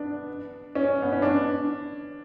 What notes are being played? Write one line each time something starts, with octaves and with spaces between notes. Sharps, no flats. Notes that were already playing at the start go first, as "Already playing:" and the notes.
Already playing: B3 D4
C#4
B3
C#4
D4